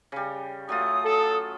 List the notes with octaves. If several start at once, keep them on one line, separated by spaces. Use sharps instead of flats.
C#3 G3
F#3 A3 F4 D#6
A4